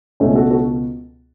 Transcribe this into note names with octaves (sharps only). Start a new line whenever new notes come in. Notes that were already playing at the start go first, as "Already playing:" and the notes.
C#2 B2 A3 C#4
F#4 A4
F#4 A4